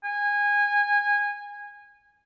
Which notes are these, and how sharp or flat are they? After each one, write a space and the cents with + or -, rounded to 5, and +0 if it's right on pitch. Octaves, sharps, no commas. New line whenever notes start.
G#5 -20